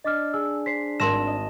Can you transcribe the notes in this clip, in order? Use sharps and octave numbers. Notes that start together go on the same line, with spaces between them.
D4 D#5 D6 F6 A6 B6 C7
G#4 E6
C5 B6 C7
G#1 A#4 A5 C6 E6 A#6 E7
D#5